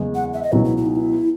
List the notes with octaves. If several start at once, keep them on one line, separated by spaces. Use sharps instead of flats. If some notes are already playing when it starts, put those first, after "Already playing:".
Already playing: F#1 E2 C#3 G#3
F#5
E5
D#5
C#2 B2 F#3 B3 E4
E4
E4
D#4
E4